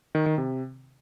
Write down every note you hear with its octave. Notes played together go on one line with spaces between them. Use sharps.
D#3
D#3
C3